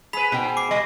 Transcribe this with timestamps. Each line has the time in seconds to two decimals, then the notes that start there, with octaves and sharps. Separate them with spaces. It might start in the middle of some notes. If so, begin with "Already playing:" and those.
0.13 G#4 B4 B5 B6 F7
0.32 G#2 B2 C5 G5
0.45 G#4
0.57 D6 C7
0.71 G3 D#5